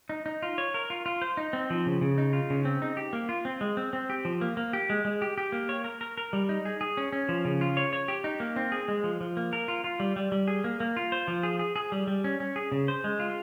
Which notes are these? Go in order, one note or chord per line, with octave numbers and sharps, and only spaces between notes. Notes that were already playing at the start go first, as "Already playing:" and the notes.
D#4
D#4
F4
C#5
A#4
F4
F4
C5
D#4
C4
F3
C#3
C#3
D#4
F4
C#3
C4
D#4
G4
A#3
F4
C4
G#3
C4
C4
G4
F3
A#3
A#3
G4
G#3
G#3
G4
G4
A#3
C#5
A#4
A#4
A#4
G3
D#4
G#4
G#4
C#4
C#4
F3
C#3
F4
C#5
C#5
G4
D#4
A#3
C4
G#4
G#3
F3
F3
A#3
A#4
F4
F4
G3
G3
G3
G#4
A#3
A#3
F4
C5
F3
G#4
G#4
G#4
G3
G3
C#4
C#4
G#4
C#3
C5
G#3
F4